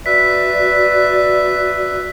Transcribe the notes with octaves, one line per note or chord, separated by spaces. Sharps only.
F#4 B4 D5 E5 B6